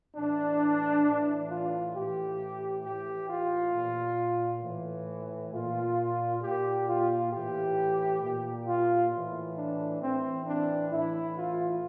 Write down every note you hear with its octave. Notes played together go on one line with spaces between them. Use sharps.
A2 E3 D4
A2 E3
F4
A2 E3 G4
A2 E3 G4
F4
A#2
A2 E3
A#2 F4
A#2 G4
F4
A2 E3 G4
A#2
F4
A2 E3
D4
A2 E3 C4
D4
A2 E3 E4
F4